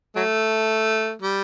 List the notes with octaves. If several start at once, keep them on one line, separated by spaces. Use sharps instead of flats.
F#3 A3
G3